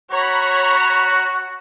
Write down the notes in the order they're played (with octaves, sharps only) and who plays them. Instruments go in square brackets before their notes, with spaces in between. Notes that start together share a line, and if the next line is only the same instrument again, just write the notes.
[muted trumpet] F#4 [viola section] C#5 A#5 B5